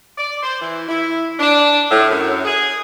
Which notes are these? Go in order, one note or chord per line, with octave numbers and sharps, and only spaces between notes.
D5
C5
E3
E4
D4
A2
F#2
G#4